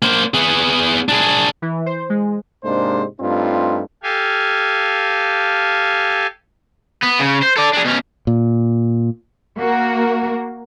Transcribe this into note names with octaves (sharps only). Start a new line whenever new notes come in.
A#3 C5
B3 G#4
D4 G#4
E3
C5
G#3
G#2 C3 G#3 A#3 D4 C5
G2 A3 C4 D#4 F4
G4 A4 F5 G#5
B3
C#3
C5
A4 D5
D4 G#4
B2 C#4
A#2
A#3 F#4 A#4